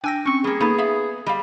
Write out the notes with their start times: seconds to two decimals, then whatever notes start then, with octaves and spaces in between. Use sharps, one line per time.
0.04 D4 G5 G#5 E6 A#6
0.26 C4 C#4 C#6
0.44 G3 A#3 G#4
0.61 A#3 B3 D#4 A4
0.78 E5 F5 B5
1.26 G3 D#5 F5